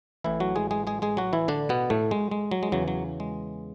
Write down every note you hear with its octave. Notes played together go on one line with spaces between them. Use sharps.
A1 A2 E3 E4
F#3 F#4
G#3 G#4
G#3 G#4
G#3 G#4
G#3 G#4
F#3 F#4
E3 E4
D3 D4
B2 B3
A2 A3
G#3
G#3
F#3
G#3
E2 C#3 E3 F#3
F#3
G#3